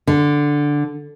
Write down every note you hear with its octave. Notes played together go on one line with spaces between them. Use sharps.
D3